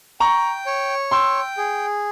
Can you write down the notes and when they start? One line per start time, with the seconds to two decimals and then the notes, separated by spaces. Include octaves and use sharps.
0.20 G5 A#5 C#6
0.66 C#5
1.11 G5 C6 E6
1.57 G#4